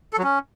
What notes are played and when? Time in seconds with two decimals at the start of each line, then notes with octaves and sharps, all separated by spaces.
0.13 A4
0.18 F#3
0.23 C#4